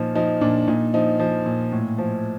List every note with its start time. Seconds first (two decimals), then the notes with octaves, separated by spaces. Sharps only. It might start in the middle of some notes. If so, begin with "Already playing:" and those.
Already playing: A#2 F3 D#4
0.15 F3 D#4
0.41 A#2 D4
0.68 A#2 D#4
0.94 F3 D#4
1.20 F3
1.46 A#2
1.72 A2
1.98 F3